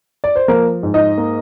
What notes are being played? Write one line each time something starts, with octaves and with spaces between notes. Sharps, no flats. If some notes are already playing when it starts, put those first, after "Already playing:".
D5
C5
F3 A#3 A#4
G#2
D#4 D#5
A#3